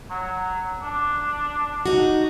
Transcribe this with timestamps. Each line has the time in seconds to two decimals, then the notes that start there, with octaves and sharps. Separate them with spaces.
0.10 F#3
0.82 D4
1.86 D#4 F#4